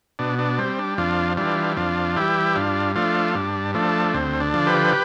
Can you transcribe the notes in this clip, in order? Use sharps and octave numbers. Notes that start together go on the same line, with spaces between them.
B2 D4
D4
G3 C4
D4
F2 D4 F4
E3 G3 D4 F4
F2 D4 F4
E3 G3 E4 G4
G2 D4 F4
F3 A3 D4 F4
G2 D4
F3 A3 D4
D2 C4
D4
D3 F3
G4 B4